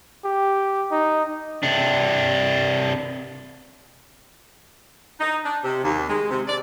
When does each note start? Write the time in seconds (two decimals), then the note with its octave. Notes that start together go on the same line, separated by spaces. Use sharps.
0.25 G4
0.91 D#4
1.63 C3 D4
5.20 D#4
5.44 D4
5.63 C3
5.83 D#2
6.08 G#3
6.30 C3
6.48 D5